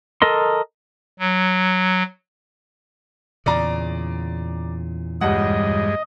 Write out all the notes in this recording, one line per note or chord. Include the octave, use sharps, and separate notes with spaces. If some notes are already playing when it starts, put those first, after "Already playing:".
A4 A#4 D#5 C6
F#3
E2 A#2 C#3 D5 A#5
D#1 G2 G3 G#3 D#5 F#5